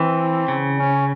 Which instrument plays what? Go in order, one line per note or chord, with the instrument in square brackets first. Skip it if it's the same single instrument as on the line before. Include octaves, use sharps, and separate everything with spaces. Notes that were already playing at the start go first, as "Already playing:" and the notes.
Already playing: [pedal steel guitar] E3 [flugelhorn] C4
[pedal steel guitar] C#3
[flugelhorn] C#4